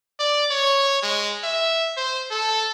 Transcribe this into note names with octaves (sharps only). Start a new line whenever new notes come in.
D5
C#5
G#3
E5
C5
A4